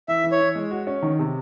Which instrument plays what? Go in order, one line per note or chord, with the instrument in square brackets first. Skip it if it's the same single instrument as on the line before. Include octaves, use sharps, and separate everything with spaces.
[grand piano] E3 [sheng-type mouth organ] E5
[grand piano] E3
[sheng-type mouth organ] C#5
[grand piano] E3
G#3
F#4
C#4
D#3
C3